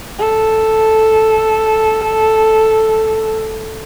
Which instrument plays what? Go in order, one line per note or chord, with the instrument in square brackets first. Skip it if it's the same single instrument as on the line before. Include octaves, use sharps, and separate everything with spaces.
[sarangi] A4